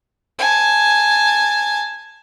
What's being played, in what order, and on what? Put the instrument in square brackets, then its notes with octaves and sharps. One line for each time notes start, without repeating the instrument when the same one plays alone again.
[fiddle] G#5 A5